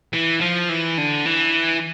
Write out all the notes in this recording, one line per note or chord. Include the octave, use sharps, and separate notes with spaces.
E3
F3
E3
D3
E3